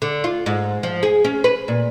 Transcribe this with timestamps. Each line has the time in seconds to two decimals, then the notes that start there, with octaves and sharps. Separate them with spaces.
0.02 D3
0.24 F4
0.46 G#2
0.83 F3
1.03 G#4
1.25 C#4
1.44 B4
1.68 A#2